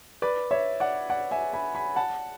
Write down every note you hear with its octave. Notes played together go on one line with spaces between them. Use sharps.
B4 D5
C#5 E5
D5 F#5
D5 F#5
E5 G#5
G#5 B5
G#5 B5
F#5 A5